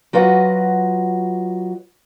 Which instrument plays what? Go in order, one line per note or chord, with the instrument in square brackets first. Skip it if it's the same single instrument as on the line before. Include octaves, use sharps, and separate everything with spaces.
[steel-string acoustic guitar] F#3 F4 F#4 B4 D#5 F#5